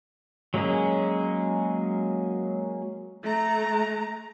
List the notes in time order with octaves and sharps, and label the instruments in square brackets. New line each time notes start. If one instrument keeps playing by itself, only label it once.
[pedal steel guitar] F#3 G#3 A#3 C#4 G#4
[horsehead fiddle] A3 A#5